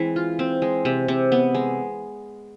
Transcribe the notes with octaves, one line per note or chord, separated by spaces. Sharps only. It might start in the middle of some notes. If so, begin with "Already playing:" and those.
Already playing: E3 G#3 C4
F4
C4
G#3
C3
C3
B3
G#3